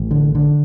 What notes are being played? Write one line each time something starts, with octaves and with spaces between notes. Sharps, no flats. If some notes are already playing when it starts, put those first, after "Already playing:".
Already playing: A1
D3
D3